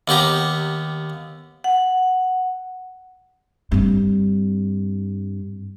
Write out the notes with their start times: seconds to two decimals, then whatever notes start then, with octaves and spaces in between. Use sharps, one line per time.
0.08 D#2 B3 G4 A#5
1.64 F#5
3.72 G2 C4